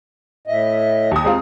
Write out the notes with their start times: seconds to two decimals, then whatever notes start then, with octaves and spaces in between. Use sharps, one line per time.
0.47 A2 D#5 E5
1.11 D#2 D#6
1.24 G#3 C4 F4 A#5